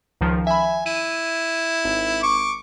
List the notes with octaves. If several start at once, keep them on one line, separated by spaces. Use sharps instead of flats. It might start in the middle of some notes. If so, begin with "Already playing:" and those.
C#2 D#3 F3
E5 G#5 B5
E4 D#7
G#1
C#6 D6